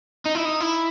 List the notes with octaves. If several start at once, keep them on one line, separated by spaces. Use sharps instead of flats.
D#4
E4
D#4
E4